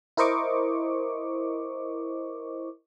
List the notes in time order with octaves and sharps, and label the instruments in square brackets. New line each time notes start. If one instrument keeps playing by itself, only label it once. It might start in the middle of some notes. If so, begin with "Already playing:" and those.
[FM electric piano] E4 A#4 C5 D#5 C#6 D6